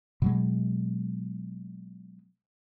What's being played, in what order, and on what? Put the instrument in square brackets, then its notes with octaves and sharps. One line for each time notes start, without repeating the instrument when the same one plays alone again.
[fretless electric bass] B2 F#3 G#3